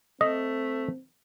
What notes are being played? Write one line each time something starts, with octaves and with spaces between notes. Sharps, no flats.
A3 C4 D#5